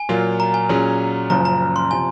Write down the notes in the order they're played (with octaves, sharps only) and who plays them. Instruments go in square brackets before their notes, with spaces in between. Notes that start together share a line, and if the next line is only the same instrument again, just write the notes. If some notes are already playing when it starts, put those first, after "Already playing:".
Already playing: [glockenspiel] G#5
[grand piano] A#2 F#3 A#3 F4
[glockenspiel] A#5
G#5
[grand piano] A#2 F#3 C#4 G#4
[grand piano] F#1 F#2 C#3 F3 [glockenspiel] A#5
[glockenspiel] A#5
C6
[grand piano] C3 F3 [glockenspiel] G#5